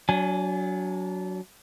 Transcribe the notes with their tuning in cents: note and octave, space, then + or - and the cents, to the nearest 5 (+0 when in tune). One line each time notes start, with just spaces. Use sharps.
F#3 +5 D4 -30 G#5 +0